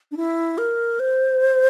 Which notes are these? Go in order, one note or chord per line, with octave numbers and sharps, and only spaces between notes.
D4
E4
A#4
C5